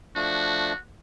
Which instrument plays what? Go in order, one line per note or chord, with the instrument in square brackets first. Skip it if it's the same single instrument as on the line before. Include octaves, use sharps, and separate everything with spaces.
[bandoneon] F3 A3 D4 [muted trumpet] F#4